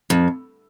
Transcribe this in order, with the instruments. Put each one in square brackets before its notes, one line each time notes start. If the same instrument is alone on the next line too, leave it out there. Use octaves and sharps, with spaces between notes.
[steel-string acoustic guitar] F2